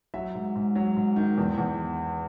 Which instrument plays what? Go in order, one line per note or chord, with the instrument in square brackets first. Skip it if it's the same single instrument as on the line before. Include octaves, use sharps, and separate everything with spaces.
[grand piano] F#3 E5
G#2
G#2
F#3
G#2
D#3
E2
E2